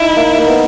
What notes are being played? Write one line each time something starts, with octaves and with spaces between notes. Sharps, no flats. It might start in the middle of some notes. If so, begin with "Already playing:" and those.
Already playing: D#4 E4
A#3
A#3
B3